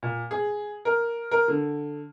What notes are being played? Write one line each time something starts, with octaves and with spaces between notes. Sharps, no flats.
A#2
G#4
A#4
A#4
D3